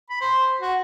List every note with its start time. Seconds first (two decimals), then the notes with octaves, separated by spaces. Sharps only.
0.10 B5
0.21 C5
0.61 F#4